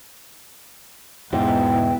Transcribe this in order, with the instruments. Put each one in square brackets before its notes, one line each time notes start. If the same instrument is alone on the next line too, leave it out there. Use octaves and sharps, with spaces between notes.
[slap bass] E2 B2 [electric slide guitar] G#2 [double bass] B3 E4 [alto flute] G5